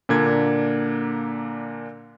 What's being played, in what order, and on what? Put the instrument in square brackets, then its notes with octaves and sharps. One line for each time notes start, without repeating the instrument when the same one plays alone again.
[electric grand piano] A#2 D3 A#3 D4 G#6